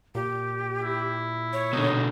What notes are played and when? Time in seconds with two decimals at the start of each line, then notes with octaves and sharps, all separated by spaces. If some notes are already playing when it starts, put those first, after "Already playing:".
0.15 A#2 G4
0.82 E4
1.53 C#5
1.73 B2 D3 D#4